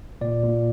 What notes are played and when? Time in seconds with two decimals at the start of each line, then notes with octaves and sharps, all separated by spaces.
0.21 A#2 D5
0.44 A#2